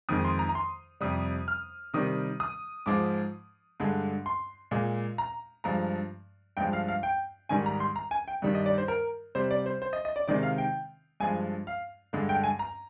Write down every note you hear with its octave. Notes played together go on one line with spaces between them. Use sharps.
F2 D#3 G#3 D#6
C6
A#5
A#5
C6
F2 C3 G3 D#6
F6
C3 D#3 G3 D#6
D#6
G#2 F3 G#3 D6
G2 D3 G#3
C6
A#2 G#3
A#5
G2 F3 G#3 A#5
G2 F3 G#3 G5
F5
F5
G5
G#2 D#3 G3 G#5
A#5
C6
A#5
G#5
G5
G2 D#3 G3
D#5
D5
C5
A#4
C3 G3 C5
D5
C5
C5
D#5
D#5
D5
C3 D#3 G#3 D5
F5
G5
G2 F3 G#3 G#5
F5
G2 D3 G#3
G5
G#5
A#5